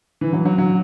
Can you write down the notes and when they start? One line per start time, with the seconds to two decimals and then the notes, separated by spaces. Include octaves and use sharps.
0.21 E3
0.33 F#3
0.45 F#3
0.58 F#3